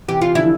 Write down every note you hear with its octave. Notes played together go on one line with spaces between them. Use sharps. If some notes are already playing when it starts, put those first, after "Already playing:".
C3 E3 G4
F4
D3 F3 E4